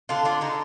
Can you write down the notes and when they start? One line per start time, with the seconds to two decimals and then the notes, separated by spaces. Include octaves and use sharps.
0.09 D3 F4
0.25 D3 F4
0.41 D3 D#4